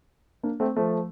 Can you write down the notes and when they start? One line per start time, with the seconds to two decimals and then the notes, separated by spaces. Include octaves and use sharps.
0.43 A#3 D4
0.60 A3 C4
0.76 F3 A3